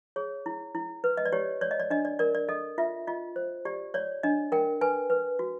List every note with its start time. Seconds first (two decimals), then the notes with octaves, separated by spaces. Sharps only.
0.16 G#4 C#5
0.46 E4
0.75 E4
1.04 B4
1.17 D#5
1.26 D5
1.33 G4 C#5
1.61 C#5 D5
1.71 D#5
1.80 D5
1.90 D4 D#5
2.05 D5
2.19 A#4 D5
2.35 D5
2.49 A4 D#5
2.78 F4 E5
3.07 F4 D#5
3.36 C5
3.65 G4 D5
3.94 C#5 D5
4.23 D4 D#5
4.52 A#4 G5
4.81 B4 G#5
5.10 B4
5.39 F#4